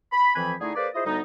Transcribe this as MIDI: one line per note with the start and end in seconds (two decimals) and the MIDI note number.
0.13 0.32 83
0.36 0.54 41
0.36 0.54 52
0.36 0.54 53
0.36 0.54 60
0.36 0.54 80
0.36 0.54 83
0.61 0.71 50
0.61 0.71 57
0.61 0.71 63
0.61 0.71 64
0.61 0.71 68
0.76 0.88 58
0.76 0.88 68
0.76 0.88 71
0.76 0.88 72
0.76 0.88 74
0.94 1.02 64
0.94 1.02 65
0.94 1.02 68
0.94 1.02 72
0.94 1.02 75
1.06 1.20 38
1.06 1.20 55
1.06 1.20 59
1.06 1.20 63